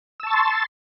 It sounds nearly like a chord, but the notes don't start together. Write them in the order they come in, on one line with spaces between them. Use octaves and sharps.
E6 A5 C#6 A6 C6